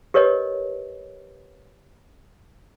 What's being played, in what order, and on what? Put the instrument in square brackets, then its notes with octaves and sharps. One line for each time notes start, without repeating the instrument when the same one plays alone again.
[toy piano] G4 A#4 B4 C#5 D#5